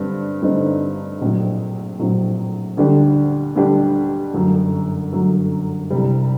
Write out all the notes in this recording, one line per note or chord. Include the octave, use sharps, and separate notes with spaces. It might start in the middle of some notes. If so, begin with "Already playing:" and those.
Already playing: G2 D3 C4
G2 D3 A3 C4 D#4
A#1 A2 F#3 A3 C4
A#1 A2 F#3 A3 C4
D2 D3 G3 D4 G4
D2 D3 G3 D4 G4
G1 F#2 F#3 A3
G1 F#2 F#3 A3
C2 C3 G3